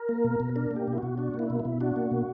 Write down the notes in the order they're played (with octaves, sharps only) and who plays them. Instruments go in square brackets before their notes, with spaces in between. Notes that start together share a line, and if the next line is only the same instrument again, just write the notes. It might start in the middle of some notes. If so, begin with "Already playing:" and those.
Already playing: [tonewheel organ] A#4
A#3
B2
B2
D4 A#4
A#3
G4
B2
E4
B2 F#4
D4 F#4
A#3
E4
B2
E4
B2
D4 F#4
A#3
B2